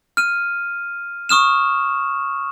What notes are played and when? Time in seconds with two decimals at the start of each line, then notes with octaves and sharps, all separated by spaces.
0.17 F6 D#7
1.29 C#6 D#6 F6 E7